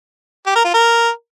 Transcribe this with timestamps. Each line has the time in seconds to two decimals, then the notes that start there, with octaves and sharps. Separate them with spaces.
0.46 G4
0.55 A#4
0.65 F4
0.74 A#4